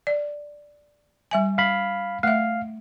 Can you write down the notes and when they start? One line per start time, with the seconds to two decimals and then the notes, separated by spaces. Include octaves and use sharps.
0.07 D5
1.31 G3 E5 G#5
1.58 F5 B5
2.23 A3 E5 F5